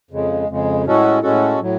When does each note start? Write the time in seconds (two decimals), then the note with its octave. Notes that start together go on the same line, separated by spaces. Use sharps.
0.11 F2 C#3 G#3
0.48 F2 C#3 G#3
0.86 A2 G#3 C#4 F#4 A4
1.22 A2 G#3 C#4 F#4 A4
1.59 A2 F#3